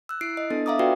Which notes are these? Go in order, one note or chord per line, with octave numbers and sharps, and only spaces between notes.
E6 F#6
E4 C7 D7
D#5
B3 D4 A4 A6
E5 F5 A#5 D6 D#6
F4 F#4 B4 D5 F5 G5